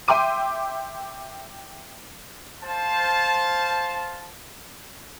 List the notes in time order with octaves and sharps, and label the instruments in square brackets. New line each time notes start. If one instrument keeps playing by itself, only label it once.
[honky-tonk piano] E5 G5 C6 D6 D#7
[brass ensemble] C5 F5 A5